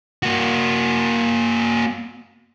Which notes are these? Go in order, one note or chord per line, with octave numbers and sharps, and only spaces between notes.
A#3 F#4